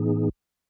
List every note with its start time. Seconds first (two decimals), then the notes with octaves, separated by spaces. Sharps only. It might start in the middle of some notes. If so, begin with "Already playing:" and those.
Already playing: A2 E3 B3 D#4 G#4